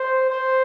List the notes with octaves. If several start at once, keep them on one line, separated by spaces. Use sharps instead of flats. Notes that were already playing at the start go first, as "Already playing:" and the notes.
Already playing: C5
C5